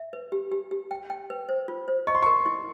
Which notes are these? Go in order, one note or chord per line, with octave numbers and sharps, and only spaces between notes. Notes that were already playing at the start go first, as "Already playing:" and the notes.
Already playing: E5
B4
G4
G4
G4
G5
G5
B4
C5
F4
C5
D#5 C#6
C6
A#4 C#6
E4